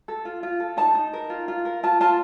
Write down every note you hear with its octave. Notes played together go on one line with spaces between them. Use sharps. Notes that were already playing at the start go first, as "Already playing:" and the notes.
A4
F4
F4
A4
D#4 A5
D#4
A#4
F4
F4
A#4
F4 A5
F4 A5